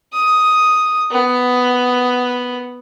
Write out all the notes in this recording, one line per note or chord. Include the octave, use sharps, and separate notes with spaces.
D#6
B3